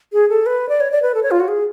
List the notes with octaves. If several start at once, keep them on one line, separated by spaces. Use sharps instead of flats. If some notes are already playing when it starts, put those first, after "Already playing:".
G#4
A4
B4
D5
C#5
D5
B4
A4
C#5
F4
F#4
G#4